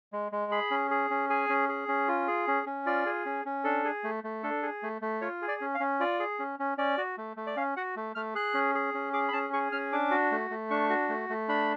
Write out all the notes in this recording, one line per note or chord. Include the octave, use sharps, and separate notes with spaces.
G#3
G#3
G#4 B5
C#4
G#4
C#4
G#4 G#5
C#4
G#4
C#4
F4
G#4
C#4
C#4
F4 D5
G#4
C#4
C#4
D4 A4
G#4
A3
A3
D4 A4
G#4
A3
A3
F4 C#5
G#4
D5
C#4
F5
C#4
F4 D5
G#4
C#4
C#4
C#4 D5
F#4
A3
A3
D5
C#4 F5
F#4 F#5
A3
A3 F6
G#4 F#6
C#4
G#4
C#4
G#4 D6
B5
C#4 A5
G#4 C#6
C#4 F6
D4 D6
F#4
A3
A3
D4 C#6
F#4
A3
A3
D4 B5